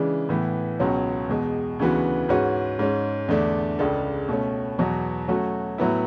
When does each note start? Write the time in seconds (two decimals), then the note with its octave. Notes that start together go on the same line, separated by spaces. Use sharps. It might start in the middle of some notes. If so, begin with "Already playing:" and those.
Already playing: C#3 E3 G#3 D4
0.29 A2 E3 B3
0.80 C#2 B2 F#3 C#4
1.29 E2 B2 G#3
1.79 D2 C#3 E3 B3 F#4
2.29 G#2 G#3 C#4 F#4 B4
2.79 G#2 G#3 C#4
3.28 E2 D3 A3 D4
3.79 C#2 C#3 G#3 D4 A4
4.29 B2 A3 C#4
4.79 E2 B2 F#3
5.28 F#3 A3 C#4 F#4
5.78 A2 F#3 B3 E4